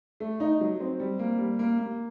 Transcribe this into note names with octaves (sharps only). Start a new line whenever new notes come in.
A3
D#4
F#3
C4
G3
A#3
G3
A#3
A#3